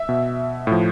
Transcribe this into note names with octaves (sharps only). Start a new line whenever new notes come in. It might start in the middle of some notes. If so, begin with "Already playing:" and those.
Already playing: E5
B2
A2 F3